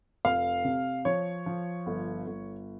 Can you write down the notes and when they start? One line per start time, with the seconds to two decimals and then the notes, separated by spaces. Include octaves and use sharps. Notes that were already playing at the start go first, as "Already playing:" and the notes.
0.25 F1 F5
0.65 C3
1.05 F3 C#5
1.46 F3
1.86 G1
2.27 G1